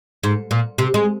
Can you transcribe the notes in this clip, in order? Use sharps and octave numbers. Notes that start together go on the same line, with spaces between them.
G#2
A#2
C3
G#3